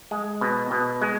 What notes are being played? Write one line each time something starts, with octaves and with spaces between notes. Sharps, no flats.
G#3
B2
B2
G#3